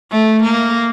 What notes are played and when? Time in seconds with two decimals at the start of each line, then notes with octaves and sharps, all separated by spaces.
0.11 A3
0.43 A#3